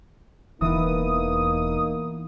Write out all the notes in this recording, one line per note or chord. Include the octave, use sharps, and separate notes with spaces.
E1 E3 A#3 B3 D#4 E4 D#6